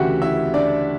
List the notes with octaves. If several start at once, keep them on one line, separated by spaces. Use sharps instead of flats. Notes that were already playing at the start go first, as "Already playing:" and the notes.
Already playing: D2 C#3 E3 F#4 G4 E5 F#5
E4 E5
D4 D5